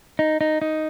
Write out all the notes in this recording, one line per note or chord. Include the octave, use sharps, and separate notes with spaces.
D#4
D#4
D#4